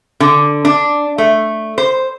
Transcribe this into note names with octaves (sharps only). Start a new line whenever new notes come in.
D3
D4
A3
C5